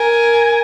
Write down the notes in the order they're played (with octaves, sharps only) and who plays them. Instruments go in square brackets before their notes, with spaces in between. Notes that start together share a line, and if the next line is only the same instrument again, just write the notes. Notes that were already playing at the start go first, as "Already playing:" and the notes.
Already playing: [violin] A#4 [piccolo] G#5